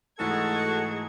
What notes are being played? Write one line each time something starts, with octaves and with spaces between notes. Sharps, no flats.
G#2 E3 A3 F#4 G#4 A4 D#5 G#6